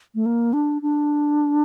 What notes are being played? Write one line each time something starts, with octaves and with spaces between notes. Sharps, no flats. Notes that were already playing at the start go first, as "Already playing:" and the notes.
A3
A#3
D4
D4